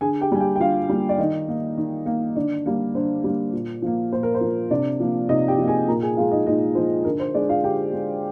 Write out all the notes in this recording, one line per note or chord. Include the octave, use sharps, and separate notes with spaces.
D3 G#4 G#5
G4 G5
G3 A#3 G#5
G4 G5
G5
D3 F4 F5
G3 A#3
D5
D#3 D#4 D#5
A#3
D#3
A#3
D3 D4 D5
G3 A#3
D3 C5
G3 A#3
A#2
F3 A#3
A#2 C5
A#4
C5
F3 A#3
C3 D4 D5
F3 A#3
C3 D#4 D#5
G4 G5
F3 A#3
G#4 G#5
A#2 A#4 A#5
G#4 G#5
F3 G#3 F4 F5
D#4 D#5
A#2 D#4 D#5
F3 G#3 C5
D3 A#4
C5
G#3 D4 D5
F4 F5
D3 G4 G5
G#3